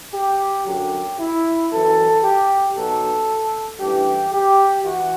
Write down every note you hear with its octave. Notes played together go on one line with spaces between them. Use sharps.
G4
F#2 D3 F#3 G4
E4
F#2 E3 A4
G4
B1 B2 F#3 A4
A1 G2 E3 G4
G4
E3 F#4